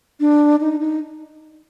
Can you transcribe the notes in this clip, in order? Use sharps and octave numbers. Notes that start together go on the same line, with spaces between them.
D4
D#4
D#4